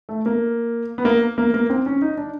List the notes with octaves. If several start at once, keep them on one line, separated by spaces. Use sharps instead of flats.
A3
A#3
B3
A#3
A#3
A#3
C4
C#4
D#4
D4